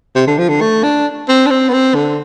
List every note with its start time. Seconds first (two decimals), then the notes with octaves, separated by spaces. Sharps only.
0.15 C3
0.27 D3
0.38 F3
0.49 D3
0.61 A3
0.83 D4
1.28 C4
1.46 D4
1.50 C4
1.69 B3
1.73 C4
1.95 D3